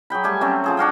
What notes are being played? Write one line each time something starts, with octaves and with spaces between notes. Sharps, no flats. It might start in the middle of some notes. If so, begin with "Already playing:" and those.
F#3 G#4 G5 B5
G3 A3 G4 G#5
F#3 A3 C4 C#4
F3 G#4 C5
D4 F#4 F5 G5